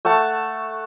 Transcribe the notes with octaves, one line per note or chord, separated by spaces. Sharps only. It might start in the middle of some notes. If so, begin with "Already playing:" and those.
A3 F#5 A5 C#6